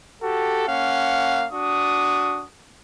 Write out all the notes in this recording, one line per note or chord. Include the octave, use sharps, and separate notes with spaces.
F#4 G4 A4
A#3 C#4 F5 F#5
D4 F#4 D#6